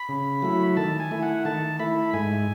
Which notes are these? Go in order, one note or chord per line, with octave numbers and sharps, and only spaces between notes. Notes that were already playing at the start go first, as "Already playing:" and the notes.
Already playing: B5
C#3
F#3 A3 E4
D#3 A5
G#5
A3 E4
F#5
D#3 A5
A3 E4 B5
G#2 G#5